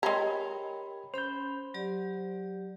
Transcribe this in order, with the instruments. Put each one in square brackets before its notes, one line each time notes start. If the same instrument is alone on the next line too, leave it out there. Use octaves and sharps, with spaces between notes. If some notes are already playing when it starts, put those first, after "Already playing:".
[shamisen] G#3 A#5 [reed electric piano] G4 B5 G#6 [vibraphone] A#4 C#5 G5
[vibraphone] C#4 B5 [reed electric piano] C5 G6
[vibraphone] F#3 G4 D5